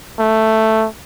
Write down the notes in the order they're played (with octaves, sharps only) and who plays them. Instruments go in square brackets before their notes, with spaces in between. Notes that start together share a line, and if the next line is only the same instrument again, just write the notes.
[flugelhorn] A3